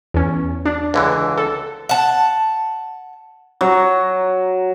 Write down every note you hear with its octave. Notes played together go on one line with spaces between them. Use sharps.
E2 C#4
D4
C#2 D3 E3
A4
F#5 A5
F#3